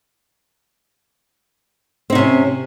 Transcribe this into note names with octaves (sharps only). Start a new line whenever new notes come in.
C3 C4 C#4 D#4